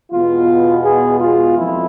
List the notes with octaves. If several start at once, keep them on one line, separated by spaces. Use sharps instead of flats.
E2 B2 G#3 B3 F4
G#4
F4
F2 E3 E4